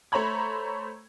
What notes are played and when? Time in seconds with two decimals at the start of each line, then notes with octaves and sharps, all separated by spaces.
0.12 A3 C5 C#5 A#5 B5 G#6